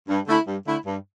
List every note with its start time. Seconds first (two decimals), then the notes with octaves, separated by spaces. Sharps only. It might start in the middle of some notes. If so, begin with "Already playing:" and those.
0.09 G2
0.28 D3 A3 E4
0.47 G2
0.67 D3 A3 E4
0.86 G2